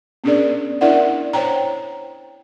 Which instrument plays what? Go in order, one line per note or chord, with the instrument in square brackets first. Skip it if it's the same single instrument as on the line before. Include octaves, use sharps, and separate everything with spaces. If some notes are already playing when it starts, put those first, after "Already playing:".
[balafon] B3 C#4 D4 G#4 A#4 D5
D4 E4 A#4 D5 E5 F#5
C5 C#5 G5 A#5